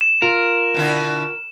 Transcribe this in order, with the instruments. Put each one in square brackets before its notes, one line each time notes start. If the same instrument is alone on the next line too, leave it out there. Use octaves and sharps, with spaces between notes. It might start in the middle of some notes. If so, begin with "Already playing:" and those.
[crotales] E7
[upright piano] F4 [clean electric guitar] A#4
[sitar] B2 D3 E4